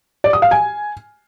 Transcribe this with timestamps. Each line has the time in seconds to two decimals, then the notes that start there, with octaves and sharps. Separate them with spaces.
0.24 D5
0.33 D#6
0.42 F5
0.51 G#5